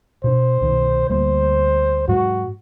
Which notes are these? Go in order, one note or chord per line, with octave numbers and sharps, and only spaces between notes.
B2 D4 C5
C2 B2 D#3
D2 G3 A#3 C5
G#2 F#3 G#3 F#4